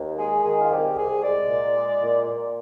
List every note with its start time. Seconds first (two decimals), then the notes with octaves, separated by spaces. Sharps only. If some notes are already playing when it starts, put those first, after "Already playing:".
Already playing: D#2
0.17 G#3 G#4
0.43 D#3 G#4
0.60 F4
0.70 C2 G4
0.96 C2 G#4
1.22 G#3 D5
1.49 A#2
1.75 G#3
2.01 A#2
2.27 A#2